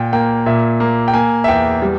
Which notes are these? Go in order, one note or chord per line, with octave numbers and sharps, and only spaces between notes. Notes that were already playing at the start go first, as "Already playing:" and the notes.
Already playing: A#2 G5
A#3 G5
A#2 E5
A#3
G5
A#3 G#5
E5
E2 G5
G3